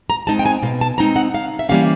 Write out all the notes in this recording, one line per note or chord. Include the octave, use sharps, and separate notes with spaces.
A#5
G#3 C4 D#4 A5
G5
G#5
B2 F5
A5
G#3 C4 D#4 A#5
F#5
C#3 F5
E5
E3 G3 A#3 C#4 F5